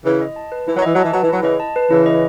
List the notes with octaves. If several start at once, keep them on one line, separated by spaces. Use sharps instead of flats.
C#3 E3 E4
D#5
A5
B4
E3 E4
F#3
E3 D#5
F#3 A5
E3
F#3 B4
E3
F#3 E4
C#3 E3 D#5
A5
B4
C#3 E3 E4
D#5